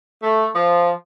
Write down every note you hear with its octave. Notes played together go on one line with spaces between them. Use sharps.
A3
F3